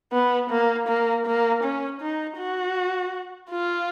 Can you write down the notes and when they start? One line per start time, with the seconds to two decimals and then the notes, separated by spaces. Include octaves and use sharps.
0.12 B3
0.50 A#3
0.88 A#3
1.26 A#3
1.63 C#4
2.01 D#4
2.38 F#4
3.51 F4